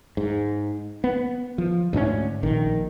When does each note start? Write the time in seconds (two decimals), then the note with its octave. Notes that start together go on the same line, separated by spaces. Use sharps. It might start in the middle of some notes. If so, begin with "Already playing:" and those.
0.17 G#2
1.04 B3
1.58 F3
1.93 D2 G#2 C4 C#4
2.43 A#1 D#3